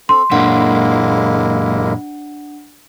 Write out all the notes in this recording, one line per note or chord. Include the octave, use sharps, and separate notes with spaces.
C4 A4 C6
F#2 A#2 G#3 A#3 D4 E4 F#5